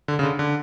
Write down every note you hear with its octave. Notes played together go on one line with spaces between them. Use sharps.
D3
C#3
D3
D3